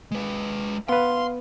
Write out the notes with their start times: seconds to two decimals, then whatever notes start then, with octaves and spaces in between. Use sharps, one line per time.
0.11 G#3 B4
0.89 B3 B4 F5 C6